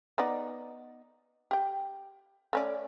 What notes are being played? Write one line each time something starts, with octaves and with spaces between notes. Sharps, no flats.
B3 D#4 D5
G4 G5
A3 C#4 D5